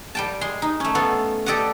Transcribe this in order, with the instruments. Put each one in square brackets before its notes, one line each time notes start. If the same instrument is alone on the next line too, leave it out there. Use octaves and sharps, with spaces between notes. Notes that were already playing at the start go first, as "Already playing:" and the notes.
[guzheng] G3 G5 A5
G#3 C6
D#4
A3 C#4
B3 F4 A4
G4 A4 D5 D#5 F#5